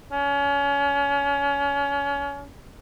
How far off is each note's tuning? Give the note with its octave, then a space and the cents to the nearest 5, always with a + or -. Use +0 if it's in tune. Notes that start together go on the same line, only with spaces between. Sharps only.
C#4 +30